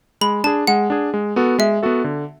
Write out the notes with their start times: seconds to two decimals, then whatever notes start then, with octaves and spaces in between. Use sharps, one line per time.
0.21 G#3 B5
0.44 D4 G#4 A5
0.67 G#3 F#5
0.90 D4 G#4
1.14 G#3
1.36 B3 F#4 A4
1.59 G#3 E5
1.83 B3 F#4 A4
2.04 D3